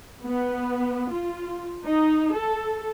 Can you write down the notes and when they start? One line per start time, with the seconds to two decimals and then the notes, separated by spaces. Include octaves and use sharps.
0.24 B3
1.12 F4
1.84 D#4
2.34 A4